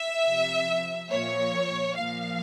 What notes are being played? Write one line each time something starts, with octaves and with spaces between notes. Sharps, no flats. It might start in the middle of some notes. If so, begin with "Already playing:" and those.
Already playing: E5
C3 F3
A#2 F3 C#5
A#2 F3 F5